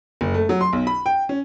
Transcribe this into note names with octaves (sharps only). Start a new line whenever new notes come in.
F#1
A3
F#3
C6
B1
B5
G5
C#4